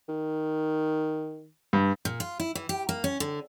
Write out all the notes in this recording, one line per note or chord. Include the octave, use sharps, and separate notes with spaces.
D#3
G2
A#2
F4
E4
E3
G4
A#3
C#4
D3